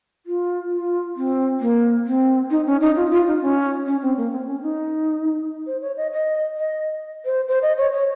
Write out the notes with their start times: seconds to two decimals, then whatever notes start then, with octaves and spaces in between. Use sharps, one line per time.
0.26 F4
0.71 F4
1.16 C4
1.61 A#3
2.07 C4
2.51 D#4
2.66 C#4
2.81 D#4
2.96 F4
3.11 F4
3.27 D#4
3.42 C#4
3.86 C#4
4.02 C4
4.17 A#3
4.32 C4
4.47 C#4
4.62 D#4
5.67 C5
5.82 C#5
5.97 D#5
6.13 D#5
6.57 D#5
7.25 C5
7.48 C5
7.62 D#5
7.77 C#5
7.93 C#5